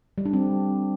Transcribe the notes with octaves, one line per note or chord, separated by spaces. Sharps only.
G3
D4
C4